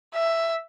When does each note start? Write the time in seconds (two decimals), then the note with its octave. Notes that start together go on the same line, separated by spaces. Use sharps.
0.14 E5